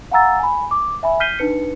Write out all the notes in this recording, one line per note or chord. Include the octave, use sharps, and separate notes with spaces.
F5 F#5 G#5 A#5 E6 A6
G#5 B5
D6
E5 G#5 B5
F6 G6 B6 C7 D#7 G7
D4 D#4 B4 C#7